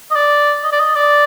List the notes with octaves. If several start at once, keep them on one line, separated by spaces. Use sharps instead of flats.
D#5
D5
D#5
D5
D#5
D5